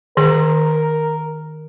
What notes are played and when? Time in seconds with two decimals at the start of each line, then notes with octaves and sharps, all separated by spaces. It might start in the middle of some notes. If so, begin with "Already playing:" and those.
0.17 D#3 G#4 A#4